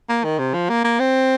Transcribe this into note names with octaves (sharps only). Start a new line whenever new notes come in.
A#3
D#3
C3
F3
A#3
A#3
C4